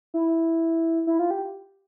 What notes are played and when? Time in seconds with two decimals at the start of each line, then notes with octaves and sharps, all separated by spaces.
0.14 E4
1.07 E4
1.19 F4
1.31 G4